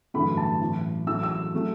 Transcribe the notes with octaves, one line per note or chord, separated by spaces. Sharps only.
A1 G2 D3 F#3 A3 B5
A5
A1 A2 F#3
A1 A2 F#3 A3 E6
E6
F#3 A3